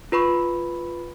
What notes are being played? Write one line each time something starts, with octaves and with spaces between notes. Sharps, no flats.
F4 B4 B5 C#6